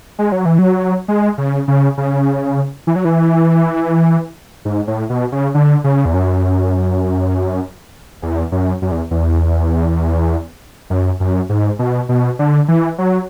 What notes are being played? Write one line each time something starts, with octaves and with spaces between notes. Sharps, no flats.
G#3
F#3
E3
F#3
G#3
C#3
C#3
C#3
E3
F#3
E3
G#2
A2
B2
C#3
D3
C#3
E2
F#2
E2
F#2
F#2
E2
E2
F#2
F#2
G#2
B2
B2
D3
E3
F#3